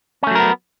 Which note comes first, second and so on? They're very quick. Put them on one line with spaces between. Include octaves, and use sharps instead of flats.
C#4 A3 F#3 A#4 B3